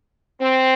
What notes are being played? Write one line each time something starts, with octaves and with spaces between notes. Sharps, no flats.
C4